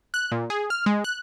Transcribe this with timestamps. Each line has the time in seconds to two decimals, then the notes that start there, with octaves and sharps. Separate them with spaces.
0.14 F#6
0.32 A#2
0.50 G#4
0.70 F6
0.86 G#3
1.04 F#6